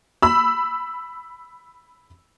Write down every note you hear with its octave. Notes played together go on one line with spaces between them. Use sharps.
B5 E6